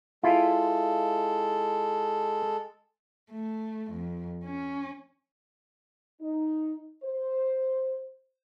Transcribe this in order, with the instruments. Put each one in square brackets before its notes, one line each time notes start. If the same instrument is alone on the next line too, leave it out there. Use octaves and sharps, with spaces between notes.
[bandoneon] G#3 A4 [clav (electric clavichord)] E4 F4
[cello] A3
F2
C#4
[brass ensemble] D#4
C5